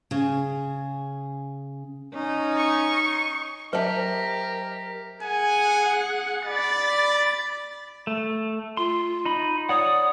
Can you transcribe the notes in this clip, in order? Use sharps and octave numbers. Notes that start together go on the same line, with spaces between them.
C#3 G#4
C#4 D#4
C#6
F#3 G4 A#4 C5 D#5 E5 A5
G#4 F#5 G#5
D5 B5 A6
A3
F4 C6
D#4 B5
C#5 D5 F#5 D#6